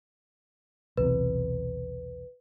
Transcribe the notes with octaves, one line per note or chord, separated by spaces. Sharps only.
B1 E2 C3 B4